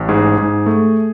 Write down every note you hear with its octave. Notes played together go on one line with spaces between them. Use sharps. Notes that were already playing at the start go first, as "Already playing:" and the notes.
Already playing: A1
G#2 G#4
G#2
A3